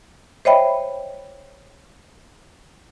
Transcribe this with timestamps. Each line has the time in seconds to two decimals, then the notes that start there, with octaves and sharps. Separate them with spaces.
0.45 C5 C#5 D#5 E5 G5 B5